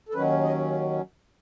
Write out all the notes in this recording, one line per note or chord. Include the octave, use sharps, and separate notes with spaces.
A4
D#2 D#3 F#3 C#4 B4
D#5